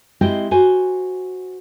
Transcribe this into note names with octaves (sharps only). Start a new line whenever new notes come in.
G#3 C4 E4 G4 D#5 G5
F#4 C5 G#5